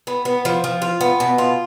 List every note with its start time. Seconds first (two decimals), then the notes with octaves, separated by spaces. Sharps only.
0.07 B3
0.25 B3
0.45 F3
0.64 F3
0.82 F4
1.01 B3
1.20 B2
1.38 F4